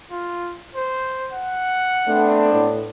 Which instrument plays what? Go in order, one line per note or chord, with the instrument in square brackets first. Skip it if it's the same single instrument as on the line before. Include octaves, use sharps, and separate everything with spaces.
[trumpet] F4
C5
F#5
[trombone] A3 [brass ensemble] B3 C4 D4
[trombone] A2